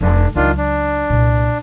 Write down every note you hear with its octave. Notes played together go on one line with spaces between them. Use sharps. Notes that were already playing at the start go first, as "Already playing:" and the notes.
F1 D4
C#2 D#3 F#3 D4 F4
D4
C2 A#2